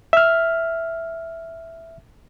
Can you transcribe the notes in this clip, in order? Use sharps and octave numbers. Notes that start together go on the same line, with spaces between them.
E5 F6